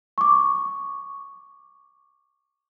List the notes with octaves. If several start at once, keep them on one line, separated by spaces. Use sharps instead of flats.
C#6 D6